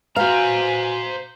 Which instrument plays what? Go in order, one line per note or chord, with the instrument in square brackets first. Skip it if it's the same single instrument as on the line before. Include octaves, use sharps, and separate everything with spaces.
[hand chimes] F#4 B4 [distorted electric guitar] C5 A#5 [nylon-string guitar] F5 [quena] G#5